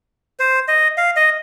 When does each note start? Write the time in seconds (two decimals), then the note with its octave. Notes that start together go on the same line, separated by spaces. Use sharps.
0.40 C5
0.68 D#5
0.97 F5
1.16 D#5